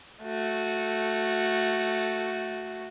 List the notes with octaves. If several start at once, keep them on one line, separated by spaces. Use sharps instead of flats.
A3 F#4